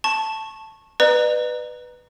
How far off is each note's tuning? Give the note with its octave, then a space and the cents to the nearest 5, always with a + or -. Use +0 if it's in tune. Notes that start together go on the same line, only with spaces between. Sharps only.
A5 +0 C#6 -15
B4 +0 D5 +45 A#5 +5